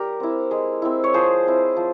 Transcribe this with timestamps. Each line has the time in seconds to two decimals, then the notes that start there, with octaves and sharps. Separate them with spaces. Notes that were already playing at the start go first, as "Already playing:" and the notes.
Already playing: G3 G4 A#4
0.20 C4 E4
0.51 G#3
0.82 C4 E4
1.04 C#5
1.14 F3 G#4 C5
1.46 C4 E4
1.76 F3